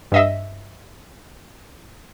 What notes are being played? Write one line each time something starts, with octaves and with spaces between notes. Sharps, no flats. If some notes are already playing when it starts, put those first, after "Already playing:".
G2 D#5 E5